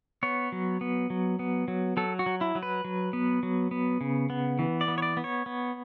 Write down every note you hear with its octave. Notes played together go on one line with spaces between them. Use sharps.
B3 C#5
F#3
B3
F#3
B3
F#3
F#3 A4
F#4
F#3
E4
F#3
B4
F#3
B3
F#3
B3
C#3
B3
E3
D5
B3
C#5
D5
B3
C#5
B3